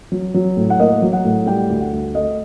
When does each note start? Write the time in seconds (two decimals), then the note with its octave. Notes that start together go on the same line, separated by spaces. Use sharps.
0.12 F#3
0.34 F#3
0.57 A2
0.70 F#5
0.79 A#3 D#5
1.02 F#3
1.13 F#5
1.24 A2
1.46 G3 G5
1.69 D2
1.81 F#5
1.92 D2
2.15 A3 D#5